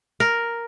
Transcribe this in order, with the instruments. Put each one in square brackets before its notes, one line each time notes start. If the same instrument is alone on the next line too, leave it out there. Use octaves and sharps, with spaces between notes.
[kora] A#4